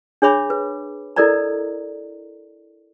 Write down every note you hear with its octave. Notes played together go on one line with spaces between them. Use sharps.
D4 G#4 C#5 E5 B5 D6
B4
E4 A4 A#4 D5 D#5 A#5